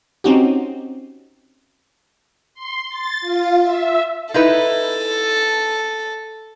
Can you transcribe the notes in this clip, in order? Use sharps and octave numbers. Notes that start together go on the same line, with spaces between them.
C4 C#4 D#4 F#4 G4
C6
A6
F4
E5
D#4 E4 A4 B4